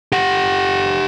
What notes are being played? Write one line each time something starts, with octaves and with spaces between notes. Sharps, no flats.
G4 F#5